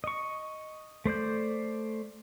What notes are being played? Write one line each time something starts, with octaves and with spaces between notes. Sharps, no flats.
D#5 C#6
A3 C5 D5 G6